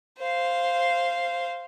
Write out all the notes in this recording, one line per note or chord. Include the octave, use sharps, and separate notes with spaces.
C5 F5